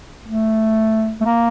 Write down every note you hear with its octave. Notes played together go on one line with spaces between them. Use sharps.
A3
A3
A#3